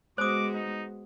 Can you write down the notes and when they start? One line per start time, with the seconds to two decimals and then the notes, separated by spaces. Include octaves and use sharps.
0.18 G#3 B3 F#4 C5 D6 D#6
0.54 D#4